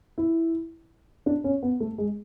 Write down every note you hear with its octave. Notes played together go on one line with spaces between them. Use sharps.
E4
D4
C#4
B3
A3
G#3